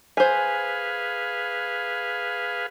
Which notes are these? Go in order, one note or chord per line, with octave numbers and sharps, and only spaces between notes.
G#4 B4 C5 F5 G#5